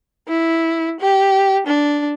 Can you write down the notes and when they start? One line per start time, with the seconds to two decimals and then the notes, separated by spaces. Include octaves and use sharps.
0.28 E4
1.00 G4
1.67 D4